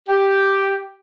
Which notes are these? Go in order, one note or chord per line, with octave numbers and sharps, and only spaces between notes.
G4